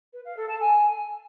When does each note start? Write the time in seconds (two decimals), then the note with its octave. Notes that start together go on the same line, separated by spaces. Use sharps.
0.13 B4
0.25 F5
0.36 A4
0.48 A5
0.60 G#5